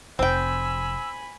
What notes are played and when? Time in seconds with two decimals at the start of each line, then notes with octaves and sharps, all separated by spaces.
0.19 F1 C4 G5 G#5 B5 E6